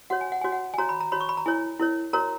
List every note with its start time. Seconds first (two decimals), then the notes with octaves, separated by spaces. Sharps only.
0.10 F#4 C#5 F#5
0.21 G#5
0.32 F#5
0.41 F#4 C#5 G#5
0.52 F#5
0.74 G#5
0.78 F#4 C#5 A#5
0.89 B5
1.01 A#5
1.12 F#4 C#5 B5
1.21 C#6
1.29 B5
1.37 A#5
1.46 E4 A#4 C#5 G#5
1.80 E4 A#4 C#5
2.13 F#4 A#4 C#5 A#5